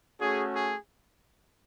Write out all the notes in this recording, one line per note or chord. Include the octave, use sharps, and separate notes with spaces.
A3 C#4 F#4 G#4
G#4